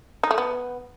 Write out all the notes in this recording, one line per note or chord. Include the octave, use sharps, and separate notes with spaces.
D#4
A3
B3